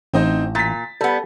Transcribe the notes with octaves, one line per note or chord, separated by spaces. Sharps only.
A1 C4 D#4 C5
A#2 A6 B6
G3 B3 A4